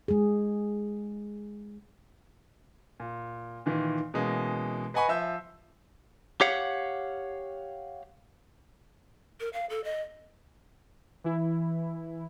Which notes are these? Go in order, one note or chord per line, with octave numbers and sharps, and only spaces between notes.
G#3 G#4
A#2
A#2 D#3 E3
B2 E3 G#3 A#3 C#4
B4 D#5 F#5 G#5 B5 C#6
F3 E5 E6 G6
G4 C#5 F5 F#5
A#4
F5
A4
D#5
E3 E4